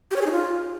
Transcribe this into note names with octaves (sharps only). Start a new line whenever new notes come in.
G4
C#5
G#4
D#4
F4